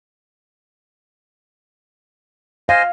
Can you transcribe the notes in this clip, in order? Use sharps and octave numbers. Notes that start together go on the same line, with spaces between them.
C5 D#5 F5 G#5